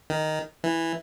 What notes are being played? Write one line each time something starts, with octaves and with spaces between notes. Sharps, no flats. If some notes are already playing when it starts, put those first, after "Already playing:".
D#3
E3